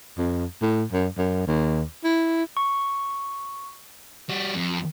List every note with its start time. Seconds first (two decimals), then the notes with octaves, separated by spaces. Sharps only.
0.18 F2
0.62 A2
0.92 F#2
1.18 F#2
1.47 D#2
2.04 E4
2.57 C#6
4.29 G3 F#4
4.55 F2